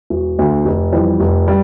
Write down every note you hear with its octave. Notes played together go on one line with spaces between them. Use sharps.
E1
D2 D3
F1
F2 E3 G3
F1
G3